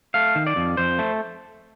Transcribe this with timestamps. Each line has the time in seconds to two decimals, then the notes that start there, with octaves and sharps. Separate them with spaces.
0.14 A3 F5
0.35 D#3
0.47 D5
0.56 F2
0.77 F2 C5
0.99 A3